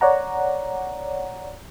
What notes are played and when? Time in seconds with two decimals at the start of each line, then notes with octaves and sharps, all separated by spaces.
0.01 C#5 D5 F#5 A#5